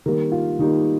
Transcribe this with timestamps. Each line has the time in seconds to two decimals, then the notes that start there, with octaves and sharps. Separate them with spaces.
0.06 D#3 G3 A#3 A#4
0.32 F4
0.59 D#3 G3 A#3 D#4